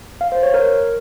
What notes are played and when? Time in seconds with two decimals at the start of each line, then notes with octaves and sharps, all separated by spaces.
0.21 F5
0.32 C5
0.43 C#5
0.54 A#4